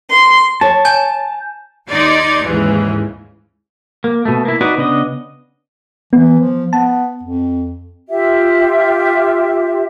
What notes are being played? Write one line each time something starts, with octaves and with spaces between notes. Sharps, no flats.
C6
C#5 A5
G#5 G6
D#2 D#4 D5 C6 G#6
D#2 G#2 C#3 E3
A#3
B2 A3
A#3 E4
D#4 F#4 B4 D5 D#5
C#3 B3 D4 D#5
E3 B3
F3
B3 A5
F2
F4 G4 E5